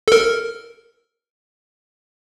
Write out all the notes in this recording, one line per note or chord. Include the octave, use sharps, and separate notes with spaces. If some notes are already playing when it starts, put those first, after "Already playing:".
A4 A#4